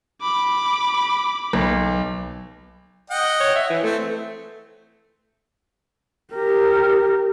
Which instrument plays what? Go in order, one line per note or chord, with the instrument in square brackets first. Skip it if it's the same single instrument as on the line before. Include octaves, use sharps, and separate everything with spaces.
[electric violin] B5 D6
[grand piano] B1
[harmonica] D#5 F#5 G5
[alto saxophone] C#5
E5
E3
[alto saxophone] A3 [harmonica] C4
[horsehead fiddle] G4 A#4